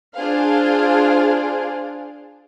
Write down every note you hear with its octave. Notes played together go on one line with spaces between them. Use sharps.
D4 F4 G#4 C5 F5